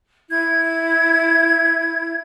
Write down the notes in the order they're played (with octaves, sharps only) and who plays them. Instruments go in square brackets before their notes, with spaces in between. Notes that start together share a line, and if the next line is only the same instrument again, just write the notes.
[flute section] E4 G#6